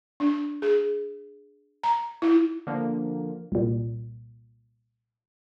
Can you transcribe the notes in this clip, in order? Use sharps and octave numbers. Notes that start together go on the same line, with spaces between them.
D4
G#4
A#5
E4
D3 F3 A#3
C2 A#2